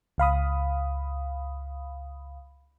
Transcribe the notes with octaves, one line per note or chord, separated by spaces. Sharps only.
C#2 F5 B5 D#6